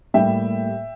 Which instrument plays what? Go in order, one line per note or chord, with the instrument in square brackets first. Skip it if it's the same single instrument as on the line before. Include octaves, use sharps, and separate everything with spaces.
[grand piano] A2 G3 A#3 E5 G5